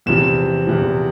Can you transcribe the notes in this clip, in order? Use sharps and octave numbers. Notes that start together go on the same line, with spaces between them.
E2 C3 F3 E7
E2 C3 F3